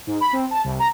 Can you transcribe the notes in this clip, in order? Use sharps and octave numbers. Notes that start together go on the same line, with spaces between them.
G#2
B5
C4
A5
C2
A#5